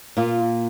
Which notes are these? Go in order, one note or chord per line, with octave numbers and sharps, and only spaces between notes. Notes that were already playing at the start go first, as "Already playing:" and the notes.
A#2 A#3 F4